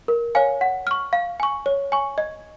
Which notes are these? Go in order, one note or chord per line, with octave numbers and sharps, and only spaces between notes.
A#4
C#5 F5 G#5
F#5
C#6 F6
F5
G#5 C#6
C#5
G#5 C#6
D#5